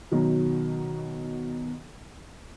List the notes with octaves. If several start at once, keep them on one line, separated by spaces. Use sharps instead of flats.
B2 D#3 F#3